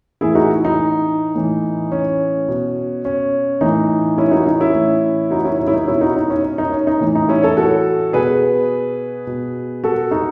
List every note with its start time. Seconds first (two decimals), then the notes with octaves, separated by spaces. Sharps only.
0.21 A2 E3 E4 G#4
0.35 D#4 F#4
0.65 D#4
1.35 A2 E3
1.92 C#4
2.48 B2
3.05 C#4
3.61 A2 E3 D#4
4.18 C#4 E4
4.31 D#4 F#4
4.47 D#4
4.60 C#4 E4
4.74 A2 E3
5.31 D#4 F#4
5.44 C#4 E4
5.59 C#4
5.67 E4
5.74 D#4
5.87 B2 C#4 E4
6.01 D#4 F#4
6.16 D#4
6.30 C#4
6.44 C#4
6.58 D#4
6.73 C#4
6.87 D#4
7.01 A2 E3
7.15 D#4
7.29 C#4 E4
7.42 A4 C#5
7.57 F#4 A4
8.13 B2 G#4 B4
9.27 B2
9.84 F#4 A4
10.11 D#4 F#4